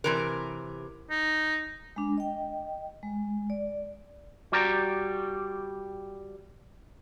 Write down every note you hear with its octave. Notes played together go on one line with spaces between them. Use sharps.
C3 E3 A#4
D#4
G#3 D4
D#5 G5
G#3
D5
G3 F#4 G4 D5 A#5